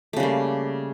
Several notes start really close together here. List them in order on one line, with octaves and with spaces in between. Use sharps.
A3 C#3 G3 A#3